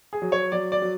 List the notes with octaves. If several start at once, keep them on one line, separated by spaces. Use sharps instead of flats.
G#4
F#3
C#5
F#3 D5
D5
F#3